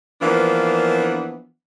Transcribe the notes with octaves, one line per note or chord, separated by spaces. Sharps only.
E3 F3 A#3 B3 D4